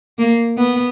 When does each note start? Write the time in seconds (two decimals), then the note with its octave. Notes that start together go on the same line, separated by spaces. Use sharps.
0.18 A#3
0.57 B3